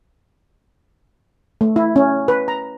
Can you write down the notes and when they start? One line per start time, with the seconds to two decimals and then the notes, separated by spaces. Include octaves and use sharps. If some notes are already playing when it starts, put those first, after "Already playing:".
1.61 A3
1.76 E4
1.96 C#4
2.28 B4
2.48 A#5